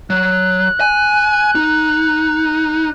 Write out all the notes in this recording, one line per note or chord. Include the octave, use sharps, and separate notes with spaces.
F#3 F#6
G#5
D#4